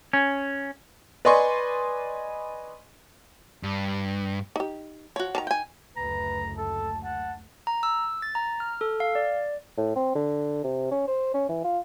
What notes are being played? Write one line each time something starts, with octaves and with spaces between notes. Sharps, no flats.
C#4
B4 D5 D#5 G#5 C6 C#6
G2
D#4 G4
F3 F#4 C#5
D#3 A5 A#5
G5 G#5
F#1 D2 A3 B4 A#5
A4 A5
F#5 A5
A#5
E6
A6
A#5
F6
A4
F5
D5
A2
C4
D3
C3
C#4
C5
C#4
E3
F4